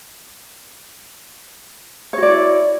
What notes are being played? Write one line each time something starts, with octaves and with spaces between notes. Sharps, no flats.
E4 F#4 C#5 D5